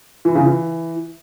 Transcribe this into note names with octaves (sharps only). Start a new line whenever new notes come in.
E3
C#3
E3